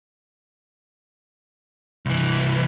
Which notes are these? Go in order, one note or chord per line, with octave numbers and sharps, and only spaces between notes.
C2 E3